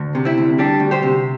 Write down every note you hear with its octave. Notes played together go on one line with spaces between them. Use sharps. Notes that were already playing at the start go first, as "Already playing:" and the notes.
Already playing: D2
C3
C4 E4
D2
G3 D4 G4
D2
G4 C5
C3